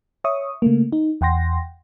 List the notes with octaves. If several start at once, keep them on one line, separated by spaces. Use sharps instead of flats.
C#5 E5 C#6 D#6
C#3 A3 A#3
D#4
E2 F#5 G5 C6 A#6